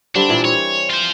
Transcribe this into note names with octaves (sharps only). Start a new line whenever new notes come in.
D3 G3 C4 D4
A#2 E3
C4 C#5
F4 C5